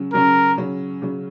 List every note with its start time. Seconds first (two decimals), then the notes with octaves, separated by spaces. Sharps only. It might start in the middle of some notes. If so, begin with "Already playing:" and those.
Already playing: C#3 F#3 C#4
0.14 C#3 F#3 C#4 A#4
0.57 C#3 F#3 C#4
1.02 C#3 F#3 C#4